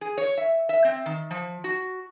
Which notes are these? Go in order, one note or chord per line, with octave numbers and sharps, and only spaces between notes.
G#4
C#5
E5
E5
C4
D#3
F3
F#4